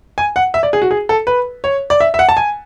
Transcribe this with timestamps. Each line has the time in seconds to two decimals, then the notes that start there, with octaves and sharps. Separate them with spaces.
0.18 G#5
0.36 F#5
0.54 E5
0.63 D5
0.73 G#4
0.82 F#4
0.91 G#4
1.09 A4
1.27 B4
1.64 C#5
1.90 D5
2.01 E5
2.14 E5
2.19 F#5
2.29 A5
2.37 G#5